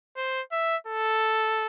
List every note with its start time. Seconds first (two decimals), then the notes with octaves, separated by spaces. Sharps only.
0.17 C5
0.52 E5
0.87 A4